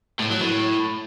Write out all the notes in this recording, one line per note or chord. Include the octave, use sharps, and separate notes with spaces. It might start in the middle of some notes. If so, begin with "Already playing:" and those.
A2
F#3
A2